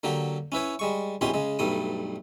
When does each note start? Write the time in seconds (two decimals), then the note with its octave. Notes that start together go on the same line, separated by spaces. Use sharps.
0.03 D3 F#3 A#3 G4
0.52 C#4 E4 B4 C#5
0.79 G3 G#3 C#6
1.21 A#1 B2 E3 C#4 G4 C6
1.34 C#3 G#3
1.59 B1 G2 G3 A3 D#6